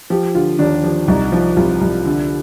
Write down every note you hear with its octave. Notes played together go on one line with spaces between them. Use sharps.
F3 G4
D3 F4
D#2 D4
F3
C2 D#4
F3
C2 F4
C2
D3